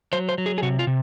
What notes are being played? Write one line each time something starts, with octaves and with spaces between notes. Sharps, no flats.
F#3 C5
C5
F#3
G#4
G#4
C3 F#4
F4
C3